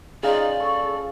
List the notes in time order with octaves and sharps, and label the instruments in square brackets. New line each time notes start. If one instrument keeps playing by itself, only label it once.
[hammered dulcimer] C#3 F4 [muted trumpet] D#4 [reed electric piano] G#4 F5 [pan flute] D5
[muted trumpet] A4 [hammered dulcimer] C#6